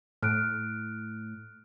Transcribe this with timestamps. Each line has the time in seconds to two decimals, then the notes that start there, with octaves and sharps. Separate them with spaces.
0.23 A2 F6 F#6 D7